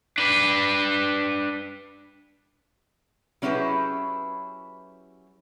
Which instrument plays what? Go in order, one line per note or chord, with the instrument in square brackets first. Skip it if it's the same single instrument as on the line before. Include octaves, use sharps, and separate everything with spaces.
[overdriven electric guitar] D4 B4
[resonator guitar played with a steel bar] F#3 C#4 E4 G4 G#4 B4